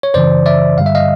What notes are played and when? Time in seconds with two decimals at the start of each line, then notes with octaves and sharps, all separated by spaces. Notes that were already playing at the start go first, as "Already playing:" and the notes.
0.03 C#5
0.14 F#2 C#3 E3 C5 D5
0.46 D5 E5
0.78 G2 D3 G3 F5
0.86 E5
0.95 D#5 F5